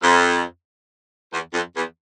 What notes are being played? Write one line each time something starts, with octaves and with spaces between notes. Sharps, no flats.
F2
E2
F2
E2